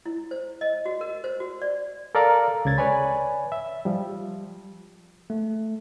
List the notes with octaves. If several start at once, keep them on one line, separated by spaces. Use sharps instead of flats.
E4
C5
D#5
F#4
A#4
C5
F#4
D5
A4 A#4 D5 F5 A#5
C#2 C#3 G#6 A6
B4 C#5 D5 G#5 B5
E5
F3 G3
A3